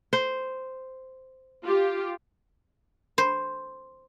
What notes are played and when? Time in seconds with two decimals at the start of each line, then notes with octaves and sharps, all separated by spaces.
0.13 C5
1.64 F4 G4
3.18 C5